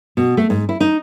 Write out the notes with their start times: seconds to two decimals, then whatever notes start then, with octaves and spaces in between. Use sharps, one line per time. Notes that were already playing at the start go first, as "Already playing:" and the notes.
0.17 B2
0.37 A3
0.50 G#2
0.69 E4
0.80 D#4